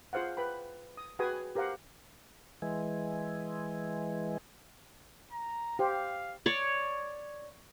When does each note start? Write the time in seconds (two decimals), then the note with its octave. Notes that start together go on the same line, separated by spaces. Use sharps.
0.13 F4 G#4 C5 F5 F#5
0.37 B4 G5 B5
0.97 D#6
1.19 F#4 G#4 B4 G5 G#5 D#6
1.55 G4 A#4 C5 F5 F#5
2.62 E3 G#3
5.32 A#5
5.79 G4 C5 F5
6.46 C#5 D5